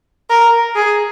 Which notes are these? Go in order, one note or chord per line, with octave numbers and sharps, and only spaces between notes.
A#4
G#4